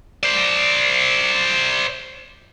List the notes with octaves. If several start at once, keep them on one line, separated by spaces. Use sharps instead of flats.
C5 D5